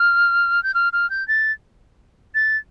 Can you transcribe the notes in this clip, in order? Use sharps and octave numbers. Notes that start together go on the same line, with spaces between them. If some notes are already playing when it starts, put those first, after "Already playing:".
Already playing: F6
G6
F6
F6
G6
A6
A6